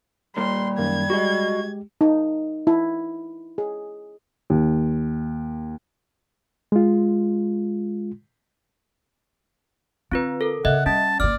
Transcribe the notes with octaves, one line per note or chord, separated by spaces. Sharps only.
D#2 A#2 G3 C6
F#2 D#3 A#3 G#6
G#3 F#4 G4 D#5
D#4
E4
G#4
D#2
G#3 F4
D3 C4 F4 B4
A4 A#4
C#3 D#5 E5 F#5 F#6
G3 C#4 A5
G1 A#3 D5 F6